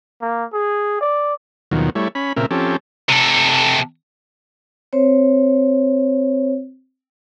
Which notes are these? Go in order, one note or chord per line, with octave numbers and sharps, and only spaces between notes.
A#3
G#4
D5
D#2 B2 D#3 F3 F#3
G3 A3 E4 C#5
C#4 B5
A#2 C#3 C4 A#4 E5
F3 C4 C#4 G4 A4
C3 A4
C4 C5 C#5